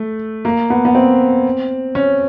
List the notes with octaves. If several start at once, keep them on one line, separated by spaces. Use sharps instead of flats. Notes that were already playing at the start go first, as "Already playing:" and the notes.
Already playing: A3
A#3
B3
B3
C4
C#4